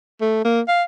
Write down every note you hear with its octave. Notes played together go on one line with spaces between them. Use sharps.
A3
A#3
F5